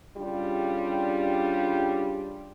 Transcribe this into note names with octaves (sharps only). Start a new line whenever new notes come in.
C#3 G3 D4 F4 G4